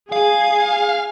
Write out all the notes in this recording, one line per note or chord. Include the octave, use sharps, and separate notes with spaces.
G#4 F5 G#5